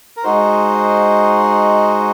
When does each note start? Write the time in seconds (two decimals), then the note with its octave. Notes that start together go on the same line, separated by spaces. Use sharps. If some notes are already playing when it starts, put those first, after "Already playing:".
0.17 A#4
0.24 G#3 D#4 F#4 C5